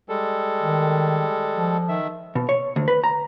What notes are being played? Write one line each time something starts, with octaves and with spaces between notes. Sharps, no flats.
G3 G#3 A4
D#3
F3
D#3 E5
B2
C#5
D2
B4
A#5